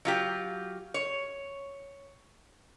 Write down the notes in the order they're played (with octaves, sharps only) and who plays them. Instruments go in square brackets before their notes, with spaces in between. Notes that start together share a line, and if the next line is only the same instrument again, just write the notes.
[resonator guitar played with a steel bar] F#3 F4 G4
C#5